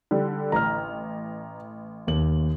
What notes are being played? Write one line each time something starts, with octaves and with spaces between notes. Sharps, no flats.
D3 G3
A1 A#5 F6
D#2 F#7